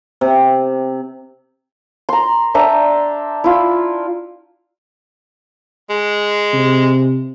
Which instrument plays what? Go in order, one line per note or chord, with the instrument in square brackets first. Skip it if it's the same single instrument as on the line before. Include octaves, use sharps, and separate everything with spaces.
[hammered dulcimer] C3
[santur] A#5 C6
D4 E5 G5 A#5
E4 F4
[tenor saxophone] G#3
[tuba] C3